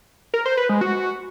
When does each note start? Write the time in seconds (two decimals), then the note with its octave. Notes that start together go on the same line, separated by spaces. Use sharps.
0.34 A#4
0.45 C5
0.57 B4
0.69 G#3
0.81 F#4